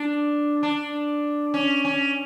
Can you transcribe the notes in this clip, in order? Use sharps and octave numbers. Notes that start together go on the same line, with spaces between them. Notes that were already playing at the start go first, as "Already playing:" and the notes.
Already playing: D4
D4
C#4
C#4